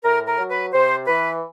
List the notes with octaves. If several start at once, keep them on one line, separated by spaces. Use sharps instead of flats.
A2 A#4
A#4
F#3
B4
C3 C5
E3 B4